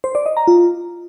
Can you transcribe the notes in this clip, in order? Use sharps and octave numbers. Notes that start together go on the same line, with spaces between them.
C5
D5
D#5
A#5
F4